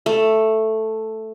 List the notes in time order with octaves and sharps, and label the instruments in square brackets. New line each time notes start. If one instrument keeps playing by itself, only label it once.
[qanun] A3